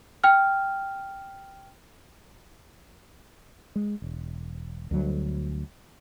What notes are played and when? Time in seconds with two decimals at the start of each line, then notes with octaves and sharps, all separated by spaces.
0.24 G5 F6
3.76 G#3
4.02 E1
4.91 D2 F#3 G3